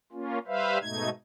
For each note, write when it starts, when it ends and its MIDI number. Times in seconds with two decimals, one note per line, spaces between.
0.13 0.38 58
0.13 0.38 61
0.13 0.38 65
0.47 0.78 55
0.47 0.78 71
0.47 0.78 72
0.47 0.78 76
0.47 0.78 77
0.81 1.09 44
0.81 1.09 47
0.81 1.09 57
0.81 1.09 63
0.81 1.09 92